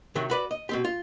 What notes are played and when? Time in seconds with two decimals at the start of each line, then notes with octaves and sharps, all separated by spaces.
0.15 C3 D#3 F#3
0.30 F#4 B4 D5
0.51 D#5
0.69 B2 C4 G4
0.84 F4